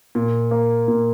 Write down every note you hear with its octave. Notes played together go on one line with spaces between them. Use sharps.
A#2
A#3
A#2